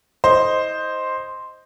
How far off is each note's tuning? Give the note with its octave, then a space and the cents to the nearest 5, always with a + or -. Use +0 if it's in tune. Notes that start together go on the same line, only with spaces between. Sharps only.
E4 -40 C5 +0 D#5 +0